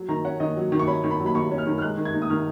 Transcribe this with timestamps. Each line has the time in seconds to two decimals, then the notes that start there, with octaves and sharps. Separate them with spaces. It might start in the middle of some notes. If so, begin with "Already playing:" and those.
Already playing: F#3
0.09 D#3 A#5
0.25 C#4 F#5
0.40 D#3 D#5
0.57 F#3
0.72 D#3
0.79 C#6
0.87 C#4 B5
1.04 D#3
1.11 B5
1.20 F#3
1.26 B5
1.35 D#3 C#6
1.51 C#4
1.58 F6
1.67 D#3
1.78 F6
1.82 G#3 F#6
1.97 D#3
2.05 G#6
2.14 D#4
2.22 D#6
2.30 D#3 F6